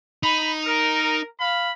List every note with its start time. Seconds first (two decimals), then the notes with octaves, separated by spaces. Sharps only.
0.23 D#4 B5
0.66 A#4
1.40 F5 B5